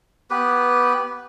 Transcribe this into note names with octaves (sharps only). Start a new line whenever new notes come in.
B3 G4 B4